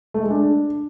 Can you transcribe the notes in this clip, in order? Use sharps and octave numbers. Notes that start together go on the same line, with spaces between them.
A3
G#3
D4